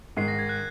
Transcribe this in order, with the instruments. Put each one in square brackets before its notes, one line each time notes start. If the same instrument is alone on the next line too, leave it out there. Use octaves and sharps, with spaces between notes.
[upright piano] G#2 D#3 G#3 [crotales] C7
[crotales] A#6
G#6
F#6